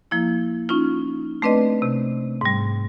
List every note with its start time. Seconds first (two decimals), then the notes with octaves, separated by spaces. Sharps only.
0.11 F3 A#3 E4
0.69 C#4 D#4 F4
1.42 A3 C4 D4 B4 D5 D#5
1.82 C3
2.41 G#2 G3